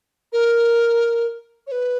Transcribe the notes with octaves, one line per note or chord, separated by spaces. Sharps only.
A#4
C#5
B4